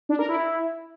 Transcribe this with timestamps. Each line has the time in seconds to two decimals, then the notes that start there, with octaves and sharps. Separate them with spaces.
0.09 D4
0.19 A#4
0.29 E4